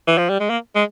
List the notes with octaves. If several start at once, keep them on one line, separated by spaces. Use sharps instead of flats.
E3
F3
G3
G#3
A#3
G#3